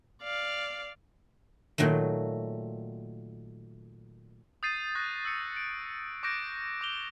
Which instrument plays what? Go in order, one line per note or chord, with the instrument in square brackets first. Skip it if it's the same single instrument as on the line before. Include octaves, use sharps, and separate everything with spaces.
[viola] D5 F5
[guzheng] A#2 D#3 F#3 A3
[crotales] D#6 G6 A6 C7 D#7
C#6 F#6 A6 A#6
E6 C#7
D7
C#6 D6 F#6 G6 A#6 D7
D6 F7 G7